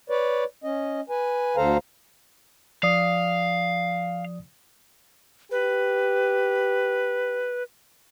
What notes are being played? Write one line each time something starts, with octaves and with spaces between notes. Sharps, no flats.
B4 C#5 D5
C#4 D#5
B4 G#5
D2 D3 A4 C5 F5 A#5
F3 D5 F5 D#6
G4 B4